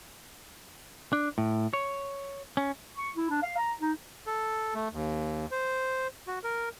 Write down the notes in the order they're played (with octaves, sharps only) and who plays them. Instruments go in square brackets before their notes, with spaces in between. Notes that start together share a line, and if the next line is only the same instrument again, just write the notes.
[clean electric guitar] D4
A2
C#5
C#4
[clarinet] C#6
E4
D4
F5
A#5
D#4
[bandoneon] A4
A3
D#2
C5
F#4
A#4